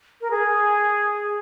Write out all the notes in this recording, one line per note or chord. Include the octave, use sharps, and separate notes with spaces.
A#4
G#4